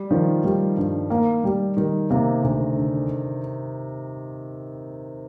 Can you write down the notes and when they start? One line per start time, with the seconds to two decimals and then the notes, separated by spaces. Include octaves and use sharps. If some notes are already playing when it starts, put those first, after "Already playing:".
Already playing: G3
0.10 D#3 F3
0.44 D#3 G3
0.77 G2
1.10 A#3
1.44 G3
1.77 D#3 G3
2.10 C3 A#3
2.44 D2
2.77 D3